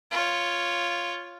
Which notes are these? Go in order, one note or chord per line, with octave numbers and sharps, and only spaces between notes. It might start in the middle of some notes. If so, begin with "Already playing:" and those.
F4 C#5